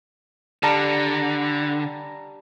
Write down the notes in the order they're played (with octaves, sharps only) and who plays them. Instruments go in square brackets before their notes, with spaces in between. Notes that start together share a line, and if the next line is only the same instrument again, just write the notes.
[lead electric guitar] D3 [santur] G3 A5 A#5